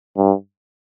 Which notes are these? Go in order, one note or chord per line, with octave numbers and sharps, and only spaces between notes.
G2